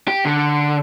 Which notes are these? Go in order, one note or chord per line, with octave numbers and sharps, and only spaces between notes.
G4
D3